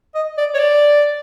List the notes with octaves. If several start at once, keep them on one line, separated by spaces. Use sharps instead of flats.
D#5
D5
C#5
D5